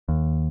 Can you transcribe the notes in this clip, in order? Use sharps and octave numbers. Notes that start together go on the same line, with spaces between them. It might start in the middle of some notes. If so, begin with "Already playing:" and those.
D#2